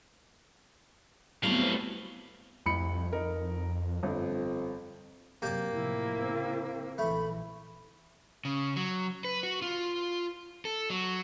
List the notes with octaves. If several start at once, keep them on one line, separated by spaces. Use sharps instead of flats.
F#3 G3 A3 B3 C4 E4 F5
C2 F2 B5 C#7
D#4 A#4
G1 F2
F#2 C3 F#3 A#3 G4 D5 A5
A2 C3 F3 E4
C#3 C4
A#1 E3 A3 B5
C#3
F#3
B4
F#4
F4
A4
F#3